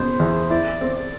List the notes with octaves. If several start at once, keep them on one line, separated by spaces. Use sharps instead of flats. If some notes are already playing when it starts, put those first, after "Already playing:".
Already playing: B2 C5
E2
E4 D5
C4
D5